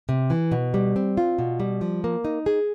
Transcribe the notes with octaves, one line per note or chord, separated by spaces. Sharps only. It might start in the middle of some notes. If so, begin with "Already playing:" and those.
C3
E3
B2
G3
C4
F4
B2
G3
F3
A#3
D#4
G#4